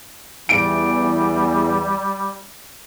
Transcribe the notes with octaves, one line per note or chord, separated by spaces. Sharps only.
E2 G3 D7